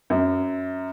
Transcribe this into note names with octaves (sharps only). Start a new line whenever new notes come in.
F#2